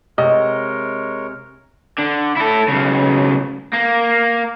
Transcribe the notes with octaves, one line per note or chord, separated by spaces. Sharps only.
C3 G#3 A#4 C#5 D#5
D3
E4 A4
B1 C#3
A#3